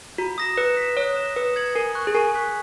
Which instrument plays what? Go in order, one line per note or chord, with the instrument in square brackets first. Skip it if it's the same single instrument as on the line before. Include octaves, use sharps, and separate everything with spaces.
[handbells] F#4 [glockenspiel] A#5
[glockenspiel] D#6 A#6 E7
[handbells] B4 [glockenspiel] F#6
[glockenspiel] B6 E7
[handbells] C#5 [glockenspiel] D#6
[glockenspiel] A#6 E7
[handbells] B4 [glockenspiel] D#6
[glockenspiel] G#6 C#7 F#7
[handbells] A#4 [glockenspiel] G#5
[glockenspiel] C#6 F#6
[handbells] G#4
[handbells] A#4 [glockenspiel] G#5
[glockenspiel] C#6 F#6 B6